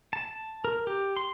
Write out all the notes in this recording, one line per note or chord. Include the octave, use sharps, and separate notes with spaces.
A5
A#4
G4
C6